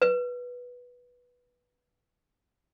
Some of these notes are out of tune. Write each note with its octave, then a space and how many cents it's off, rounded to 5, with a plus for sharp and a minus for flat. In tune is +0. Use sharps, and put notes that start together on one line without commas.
B4 -10